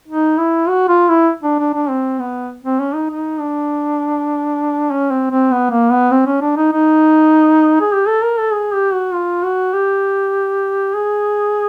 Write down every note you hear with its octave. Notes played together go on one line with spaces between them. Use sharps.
D#4
E4
F#4
F4
E4
D4
D4
D4
C4
B3
C4
C#4
D#4
D#4
D4
C#4
C4
C4
B3
A#3
B3
C4
C#4
D4
D#4
D#4
G#4
G4
A4
A#4
A4
G#4
G4
F#4
F4
F#4
G4
G#4